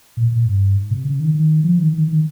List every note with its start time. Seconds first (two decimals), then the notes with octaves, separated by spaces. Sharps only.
0.17 A#2
0.32 A#2
0.46 G2
0.76 G#2
0.91 C3
1.05 C#3
1.20 D#3
1.34 D#3
1.64 F3
1.78 D#3
1.93 D#3
2.07 D#3